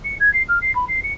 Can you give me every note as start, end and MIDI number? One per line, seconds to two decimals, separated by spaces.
0.04 0.15 97
0.20 0.32 92
0.33 0.43 96
0.48 0.59 89
0.62 0.74 96
0.75 0.85 83
0.88 1.00 96
1.04 1.13 97